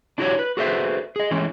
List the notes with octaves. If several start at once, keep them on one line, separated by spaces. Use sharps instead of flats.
D4 E4 F#4 G4 A#4 C#5
B4
F#4 G#4 A4 B4 C5 E5
G#4 D#5
E3 G#3 C#4